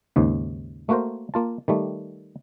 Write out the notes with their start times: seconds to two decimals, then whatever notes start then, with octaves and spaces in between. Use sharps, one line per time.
0.16 D#2 G#2 C#3
0.89 A3 A#3 F#4 A#4 C5
1.34 A#3 F4 A5
1.68 D#3 G3 A3